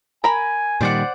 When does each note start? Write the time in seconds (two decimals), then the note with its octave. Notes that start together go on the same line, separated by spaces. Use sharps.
0.24 A#4 G#5 B5
0.81 A#2 D#3 G3 C5 D5 F#5